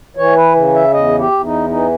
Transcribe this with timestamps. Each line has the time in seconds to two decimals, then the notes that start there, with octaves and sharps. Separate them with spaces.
0.16 E3 C#5
0.36 B4
0.55 C#3
0.74 E5
0.93 E2 D#5
1.19 G4
1.32 E2
1.44 D#4
1.70 E3 D#4